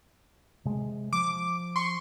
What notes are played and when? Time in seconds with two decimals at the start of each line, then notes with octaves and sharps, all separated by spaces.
0.65 C3 G#3
1.13 F3 D6
1.76 C6 C#6